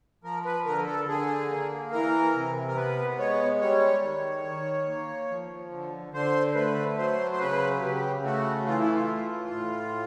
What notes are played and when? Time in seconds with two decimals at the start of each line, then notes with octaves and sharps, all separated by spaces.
0.24 F3 A#4
0.45 B4
0.66 D3 A#4
0.86 A4
1.08 D3 G#4
1.50 A#3
1.92 E3 A#4
2.35 C3
2.68 A#4
2.76 B3 B4
3.19 G#3 C#5
3.61 G3 C#5
4.03 D#3
4.45 D#3
4.87 A#3
5.29 F3
5.71 D3
6.14 D3 C5
6.55 A3 B4
6.98 F#3 C5
7.32 C5
7.40 C#3 B4
7.82 C#3 G4
8.24 A3 F#4
8.66 E3 F4
8.80 E4
8.94 F4
9.08 A2
9.50 A2